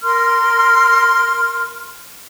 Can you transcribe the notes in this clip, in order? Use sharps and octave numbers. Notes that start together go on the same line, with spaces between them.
A#4 C6 F6